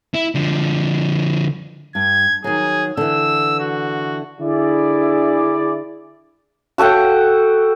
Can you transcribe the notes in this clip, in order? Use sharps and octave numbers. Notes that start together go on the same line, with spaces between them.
E4
D3 F3
G2 G#6
D#3 F#3 G#4
D3 E3 E6
F#4
D3 E4 G#4 D5
F#4 A4 F#5 G5